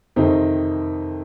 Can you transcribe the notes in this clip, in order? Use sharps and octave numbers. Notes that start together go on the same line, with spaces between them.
F2 C3 D#3 C4 D#4